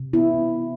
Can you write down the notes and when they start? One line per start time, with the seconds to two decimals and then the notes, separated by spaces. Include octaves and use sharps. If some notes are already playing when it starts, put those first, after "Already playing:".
Already playing: C3
0.13 B3 E4